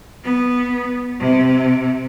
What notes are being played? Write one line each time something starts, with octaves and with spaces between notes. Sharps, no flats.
B3
C3